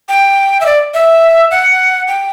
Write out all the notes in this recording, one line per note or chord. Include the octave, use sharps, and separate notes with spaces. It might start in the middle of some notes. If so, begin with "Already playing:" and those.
G5
E5
D5
E5
F#5
G5